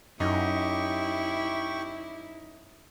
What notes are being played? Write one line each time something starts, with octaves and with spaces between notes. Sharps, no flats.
F#2 D#4 E4 G4 C#6